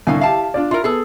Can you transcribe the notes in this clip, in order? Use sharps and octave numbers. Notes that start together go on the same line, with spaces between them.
C2 A2 D3 F5 G#5
E4 G4 F5 A5
D4 F4 D5
E4 F4 A#4
B3 G#4 A4